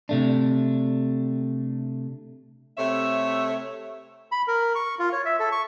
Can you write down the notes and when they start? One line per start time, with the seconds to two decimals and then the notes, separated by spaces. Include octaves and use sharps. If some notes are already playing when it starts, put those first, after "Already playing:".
0.09 C3 A3 D4
2.78 C3 A3 C#5 E5
4.32 B5
4.48 A#4
4.75 C#6
4.99 F4
5.13 C#5
5.25 E5
5.39 A4
5.52 C#6